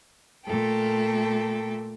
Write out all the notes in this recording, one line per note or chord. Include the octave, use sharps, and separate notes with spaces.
A#2 A3 A4 G5